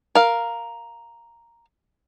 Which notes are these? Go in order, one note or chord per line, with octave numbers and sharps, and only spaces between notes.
A#4 F5